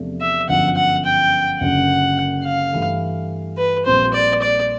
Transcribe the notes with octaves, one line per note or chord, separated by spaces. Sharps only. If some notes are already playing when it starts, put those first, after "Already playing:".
Already playing: E2 C3 F3 A3 D4
E5
G1 F#2 D3 F3 F#5
F#5
G5
F#1 F#2 D3 F#5
F5
G2 E3 A3
B4
A#1 A#2 G3 C4 F4 C5
D5
D5